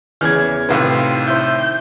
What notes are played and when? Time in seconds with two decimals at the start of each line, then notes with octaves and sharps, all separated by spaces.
0.21 E2 C#3 E3 F6 G#6
0.69 A2 C3 D#3 F4 B4 F5
1.27 E4 C5 G6